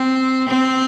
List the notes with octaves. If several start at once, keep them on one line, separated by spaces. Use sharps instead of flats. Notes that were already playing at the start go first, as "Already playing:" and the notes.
Already playing: C4
C4